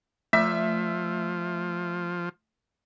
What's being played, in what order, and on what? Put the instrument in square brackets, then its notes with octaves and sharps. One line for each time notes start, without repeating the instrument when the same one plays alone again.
[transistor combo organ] F3 [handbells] A3 [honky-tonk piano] E5